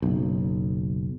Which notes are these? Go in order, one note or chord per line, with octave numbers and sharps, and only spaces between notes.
F#1 B1